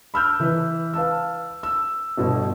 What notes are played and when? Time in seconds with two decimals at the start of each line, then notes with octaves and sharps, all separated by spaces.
0.14 B5 E6 F6 G6
0.40 E3 B4
0.94 B4 F5 A5 E6
1.63 E6
2.17 G1 B2